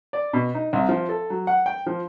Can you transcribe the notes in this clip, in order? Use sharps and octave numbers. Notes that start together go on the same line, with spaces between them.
D5
B2
D#4
C2
F3
A4
F#3
F#5
G5
F3